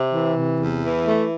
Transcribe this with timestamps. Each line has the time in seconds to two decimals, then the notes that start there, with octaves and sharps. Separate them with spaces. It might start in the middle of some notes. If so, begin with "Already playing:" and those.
Already playing: C3
0.13 E3
0.36 C3
0.60 E2
0.83 E3
1.07 A3